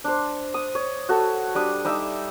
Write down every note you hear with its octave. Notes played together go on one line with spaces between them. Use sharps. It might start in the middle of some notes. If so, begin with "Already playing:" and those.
D4 C5
D#6
C#5
F#4 A4
G3 D4 D#6
G3 D#4 E5 E6